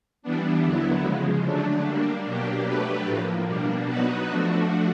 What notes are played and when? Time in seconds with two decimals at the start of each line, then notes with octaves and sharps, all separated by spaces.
0.22 E3 G3 B3 D4
0.63 D#2 D3 F#3 B3 E4
1.03 C#3 F3 G#3
1.44 D3 F#3 A3 D4
1.85 G3 A#3 D4
2.25 B2 F#3 A#3 D4 G4
2.66 F#3 A3 D4 G4 B4
3.06 A2 F3 A#3
3.46 B2 G3 A#3 D4
3.87 F#3 B3 D#4 F#4 B4
4.27 F3 A3 D4 F#4